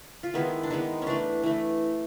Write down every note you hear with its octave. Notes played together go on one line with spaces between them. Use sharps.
F4
D#3 G#3 B3 E4
D4
D#3 G#3 B3 D#4
C#4
E3 A3 D4
E3 A3